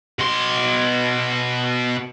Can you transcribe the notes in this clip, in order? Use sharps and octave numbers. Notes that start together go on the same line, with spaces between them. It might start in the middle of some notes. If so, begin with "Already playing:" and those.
B2 C6